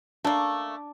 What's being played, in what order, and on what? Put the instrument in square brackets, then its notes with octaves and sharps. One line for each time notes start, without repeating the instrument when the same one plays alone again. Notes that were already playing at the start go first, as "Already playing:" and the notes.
[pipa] A3 A#3 [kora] D4